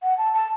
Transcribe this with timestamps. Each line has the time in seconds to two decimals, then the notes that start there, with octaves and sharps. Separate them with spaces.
0.02 F#5
0.18 A5
0.34 A5